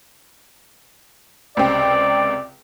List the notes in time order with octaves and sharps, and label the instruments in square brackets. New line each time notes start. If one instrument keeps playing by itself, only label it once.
[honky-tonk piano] C#2 C3 C4 [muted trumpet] D5